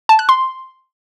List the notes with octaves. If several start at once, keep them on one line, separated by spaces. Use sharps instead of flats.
A5
F#6
C6